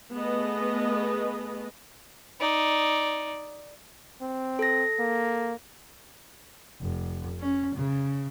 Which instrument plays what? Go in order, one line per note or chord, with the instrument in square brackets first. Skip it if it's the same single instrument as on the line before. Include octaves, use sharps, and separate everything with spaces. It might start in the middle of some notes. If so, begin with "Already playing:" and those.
[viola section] A3 B3 G#4 B4 D#5
[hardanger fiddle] D#4 D5
[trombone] C4
[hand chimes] A4 A#6
[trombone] A#3
[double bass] F1
C#4
C#3